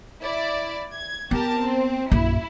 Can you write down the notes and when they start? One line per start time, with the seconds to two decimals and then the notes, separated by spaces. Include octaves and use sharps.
0.22 E4 D5
0.93 G#6
1.31 B3 G4 A#4 A5
1.60 C4
2.12 A#1 F#2 E4